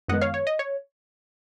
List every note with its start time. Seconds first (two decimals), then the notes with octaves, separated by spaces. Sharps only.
0.08 F#2 D#3 G#3 B3 D#5 F#5
0.21 C#5 F5
0.34 C#5
0.47 D#5
0.59 C#5